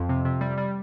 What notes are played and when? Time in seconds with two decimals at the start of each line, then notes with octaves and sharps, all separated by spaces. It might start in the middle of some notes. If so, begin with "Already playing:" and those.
Already playing: F2
0.09 C3
0.25 C3
0.41 G3
0.58 G3